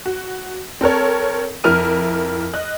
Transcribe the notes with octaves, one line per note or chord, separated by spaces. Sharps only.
F#4
C4 A4 A#4 C#5
F2 E4 A#4 F6 D#7
D#5 F#6